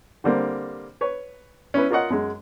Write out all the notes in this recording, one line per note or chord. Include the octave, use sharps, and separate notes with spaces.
D3 G3 A#3 C4
B4 C#5
C#4 E4 B4
F4 A#4 C#5 D#5 F#5
F#2 G#3